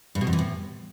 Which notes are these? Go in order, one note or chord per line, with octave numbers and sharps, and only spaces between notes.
G2
B2
F2
E3
A2